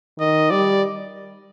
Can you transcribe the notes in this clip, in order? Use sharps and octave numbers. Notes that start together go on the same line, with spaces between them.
D#3 D#5
G3 D5